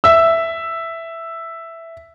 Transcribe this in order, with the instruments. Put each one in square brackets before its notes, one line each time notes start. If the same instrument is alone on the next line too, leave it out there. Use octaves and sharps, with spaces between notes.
[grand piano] E5 E6